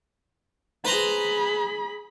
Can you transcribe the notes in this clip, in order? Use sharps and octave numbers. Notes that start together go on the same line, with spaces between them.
G#4 B4 C5 A#5 B5